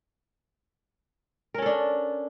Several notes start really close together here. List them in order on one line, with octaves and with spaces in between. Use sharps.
A#4 C#4 A4 D4